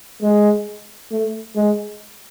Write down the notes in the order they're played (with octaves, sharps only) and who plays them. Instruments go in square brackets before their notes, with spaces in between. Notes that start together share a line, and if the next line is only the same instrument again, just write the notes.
[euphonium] G#3
A3
G#3